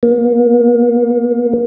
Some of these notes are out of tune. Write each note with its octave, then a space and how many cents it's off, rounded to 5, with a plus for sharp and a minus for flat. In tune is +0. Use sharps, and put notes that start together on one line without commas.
A#3 +40